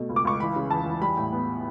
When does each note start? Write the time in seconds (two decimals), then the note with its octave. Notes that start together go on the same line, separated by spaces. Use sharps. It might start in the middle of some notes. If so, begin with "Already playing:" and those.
Already playing: B2 A3
0.09 C#2
0.16 D6
0.25 C#2 C#6
0.40 E3 B5
0.56 C#3
0.70 E2 A5
0.86 E2
1.02 G3 B5
1.17 A2
1.33 B3